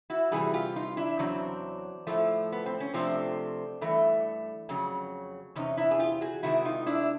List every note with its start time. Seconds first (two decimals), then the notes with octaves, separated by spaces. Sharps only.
0.10 E4 F#4
0.31 C3 E3 G3 F#4 G#4
0.54 F4 G4
0.76 D#4 F4
0.97 D4 E4
1.19 E2 C#3 F#3 C4 D4
2.07 A2 F3 A3
2.52 B3
2.66 C4
2.80 C#4
2.94 C3 F3 A3 C4 D4
3.81 G2 E3 A3
4.69 F2 C#3 F#3
5.56 E2 C3 C#4 D#4
5.77 D4 E4
5.91 G#4
5.99 F4 G4
6.21 F#4 G#4
6.43 C3 D#3 G#3 E4 F#4
6.65 D#4 F4
6.86 D4 E4